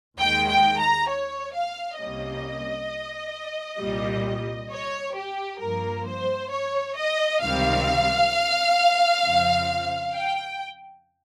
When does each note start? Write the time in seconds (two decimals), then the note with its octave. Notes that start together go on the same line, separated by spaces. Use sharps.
0.18 D#2 D#3 G#3 G5
0.48 G5
0.79 A#5
1.09 C#5
1.54 F5
1.98 C2 C3 G3 A#3 C#4 D#5
3.79 C2 A#2 G3
4.71 C#5
5.15 G4
5.60 G2 F3 A#3 A#4
6.07 C5
6.51 C#5
6.97 D#5
7.41 C#2 C3 D#3 G3 C4 F5
9.23 F2 C#3 F3 C4
10.14 G5